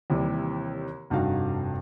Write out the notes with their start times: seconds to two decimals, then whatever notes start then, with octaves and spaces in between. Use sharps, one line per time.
0.10 D#2 C3 E3 G3
1.10 F1 G2 D#4 F#4 F5